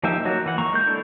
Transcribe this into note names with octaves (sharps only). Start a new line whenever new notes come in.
F3 A#3 D#4 G4 E5
F#3 A#3 D#4 F#4
E3 F#5
A#3 A#5 C#6
G#3 G6
D4 E4 A4 D5